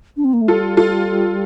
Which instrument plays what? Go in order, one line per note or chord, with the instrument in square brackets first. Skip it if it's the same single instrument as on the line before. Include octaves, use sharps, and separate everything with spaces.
[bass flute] D4
C4
A#3
A3
[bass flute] G3 [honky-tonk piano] F4 A4
[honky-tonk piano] F4 A4